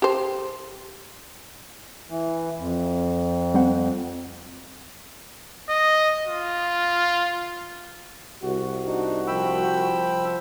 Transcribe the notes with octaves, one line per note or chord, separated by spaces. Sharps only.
G4 C5
E3
F2
G3 C4 F#5
D#5
F4
C2 F#4
D4 D#4
F3 G5 B5 E6